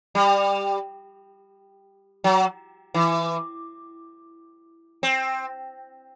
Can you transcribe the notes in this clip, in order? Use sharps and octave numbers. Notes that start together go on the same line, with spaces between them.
G3
F#3
E3
C4